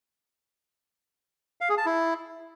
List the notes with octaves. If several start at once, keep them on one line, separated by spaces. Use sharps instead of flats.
F5
G#4
A5
E4